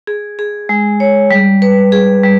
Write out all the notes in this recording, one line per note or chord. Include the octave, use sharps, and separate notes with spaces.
G#4
G#4
G#3
C#5
G3
B4
G#4
G3